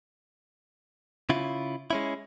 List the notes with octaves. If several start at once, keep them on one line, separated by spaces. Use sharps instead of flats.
C#3 E4 F4
G#3 C#4 E4